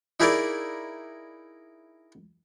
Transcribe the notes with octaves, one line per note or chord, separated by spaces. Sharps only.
D#4 E4 G#4 A#4 D5 F5